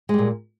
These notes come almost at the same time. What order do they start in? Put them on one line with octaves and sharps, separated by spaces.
G#3 G3 A#2